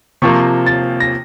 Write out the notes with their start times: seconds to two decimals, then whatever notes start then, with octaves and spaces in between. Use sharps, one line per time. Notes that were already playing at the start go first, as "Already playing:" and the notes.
0.22 C3 F3 A#3 C#6
0.67 A6
1.00 A#6